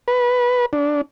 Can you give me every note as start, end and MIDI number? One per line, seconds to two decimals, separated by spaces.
0.08 0.66 71
0.73 1.01 62